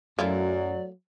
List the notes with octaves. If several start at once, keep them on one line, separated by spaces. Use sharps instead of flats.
F#2 F#3 A3 E4 F4 D5